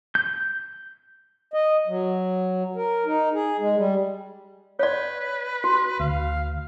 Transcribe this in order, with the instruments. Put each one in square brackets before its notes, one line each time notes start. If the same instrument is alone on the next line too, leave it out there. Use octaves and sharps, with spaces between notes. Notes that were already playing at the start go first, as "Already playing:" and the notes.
[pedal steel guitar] G6
[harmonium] D#5
F#3
A#4
D#4
G#4
G#3
G3
[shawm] B4 [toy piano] C#5 D5
[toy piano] F#4
[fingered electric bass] D2 [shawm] F5